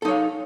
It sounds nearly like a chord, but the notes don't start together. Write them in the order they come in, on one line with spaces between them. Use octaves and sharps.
A4 D#4 C#5 F5